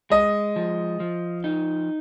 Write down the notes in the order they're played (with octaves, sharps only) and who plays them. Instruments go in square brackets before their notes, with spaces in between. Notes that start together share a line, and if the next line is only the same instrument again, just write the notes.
[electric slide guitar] G#3 [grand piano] D#5
[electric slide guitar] F3
F3
D#4